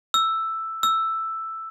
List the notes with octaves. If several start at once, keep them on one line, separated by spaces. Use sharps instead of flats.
E6
E6